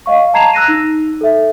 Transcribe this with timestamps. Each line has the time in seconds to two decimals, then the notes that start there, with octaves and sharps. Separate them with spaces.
0.06 D#5 F5 C#6
0.34 A5 A#5 G#6 C7 E7 F7
0.53 E6 F#6 A#6 D#7
0.68 D#4
1.21 A4 E5